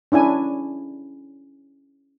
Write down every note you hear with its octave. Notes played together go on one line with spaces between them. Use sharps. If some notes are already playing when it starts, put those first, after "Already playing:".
C#4 D4 E4 G#5